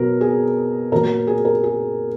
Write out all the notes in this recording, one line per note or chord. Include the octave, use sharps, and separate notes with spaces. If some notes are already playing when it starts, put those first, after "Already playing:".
Already playing: B2 F#3 A#4
G#4
A#2 F#3 A#4
G#4
A#4
G#4